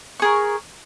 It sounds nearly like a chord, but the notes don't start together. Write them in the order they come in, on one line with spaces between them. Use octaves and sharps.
C#6 G#4 A#4